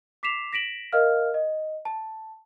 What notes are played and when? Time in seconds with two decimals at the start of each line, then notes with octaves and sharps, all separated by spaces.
0.23 D6 B6 C7 E7 F7
0.53 A#6 B6 D7 E7 F#7
0.92 A#4 D#5 F5 F6
1.34 D#5
1.85 A5